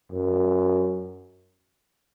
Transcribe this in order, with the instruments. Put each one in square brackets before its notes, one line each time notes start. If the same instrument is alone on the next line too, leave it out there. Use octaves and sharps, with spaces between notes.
[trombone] F#2